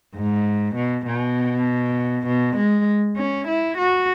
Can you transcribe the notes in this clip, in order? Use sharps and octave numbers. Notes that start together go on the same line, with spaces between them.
G#2
B2
B2
B2
G#3
C#4
E4
F#4